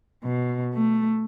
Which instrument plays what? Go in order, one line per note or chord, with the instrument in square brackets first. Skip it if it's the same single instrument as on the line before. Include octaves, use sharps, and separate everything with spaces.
[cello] B2
A3